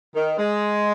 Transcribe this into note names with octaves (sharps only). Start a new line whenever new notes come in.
D#3
G#3